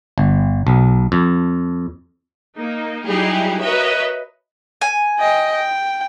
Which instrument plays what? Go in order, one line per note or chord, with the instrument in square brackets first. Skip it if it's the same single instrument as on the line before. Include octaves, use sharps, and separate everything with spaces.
[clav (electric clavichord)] G1
B1
F2
[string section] A#3 D#4
F#3 G3 D#4 E4 G4 G#4
F#4 A#4 B4 C#5 D#5 E5
[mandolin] G#5
[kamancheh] D#5 G5
G5